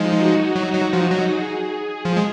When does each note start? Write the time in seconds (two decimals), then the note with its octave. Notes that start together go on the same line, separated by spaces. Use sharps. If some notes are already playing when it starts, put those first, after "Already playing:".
Already playing: F3 G#3 D#4
0.18 F#4
0.56 F#3
0.74 F#3
0.93 F3
1.11 F#3
1.30 G#4
2.05 F3
2.17 G#3